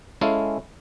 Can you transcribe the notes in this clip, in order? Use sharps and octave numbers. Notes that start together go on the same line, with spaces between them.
G#3 C#4 E4 A4 F5